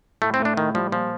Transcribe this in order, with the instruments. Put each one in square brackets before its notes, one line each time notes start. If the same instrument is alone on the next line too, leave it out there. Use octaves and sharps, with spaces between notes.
[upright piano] A2 [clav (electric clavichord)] A3
[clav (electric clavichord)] C4
[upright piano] A3
[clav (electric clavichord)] D4
[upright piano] A2 [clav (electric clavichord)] D#3
[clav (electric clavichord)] F3 [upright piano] G3
[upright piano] A#2 [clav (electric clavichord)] F3